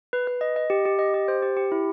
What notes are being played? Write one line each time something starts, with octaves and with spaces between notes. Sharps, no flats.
B4
B4
D#5
D#5
G4
G4
D#5
G4
C5
G4
G4
E4